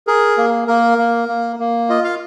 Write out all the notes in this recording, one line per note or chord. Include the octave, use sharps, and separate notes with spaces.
G#4 A#4
A#3
A#3 A#4
A#3
A#3
A#3
F4 D#5
F5